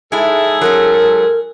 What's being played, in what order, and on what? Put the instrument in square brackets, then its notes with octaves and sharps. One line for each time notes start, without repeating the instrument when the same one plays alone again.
[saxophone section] G#2 G#4 A4 [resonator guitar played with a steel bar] G#3 E4
[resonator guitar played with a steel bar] F#3 G#3 C#4 [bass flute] A#4